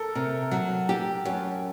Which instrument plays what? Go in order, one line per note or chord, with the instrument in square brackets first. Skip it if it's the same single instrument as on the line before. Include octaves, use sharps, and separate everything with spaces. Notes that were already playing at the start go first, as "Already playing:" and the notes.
Already playing: [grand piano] A4 A#4
[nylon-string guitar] C3 [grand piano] A#4
[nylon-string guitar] F#3
G4
F#2